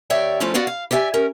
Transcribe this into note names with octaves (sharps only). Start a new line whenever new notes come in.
D#2 C#5 D5 E5 G5
D3 F3 A3 C#4 E4 F4
B3 F#4 D5 F5 F#5
F5
G4 D5 E5 F#5 G#5
C#4 A#4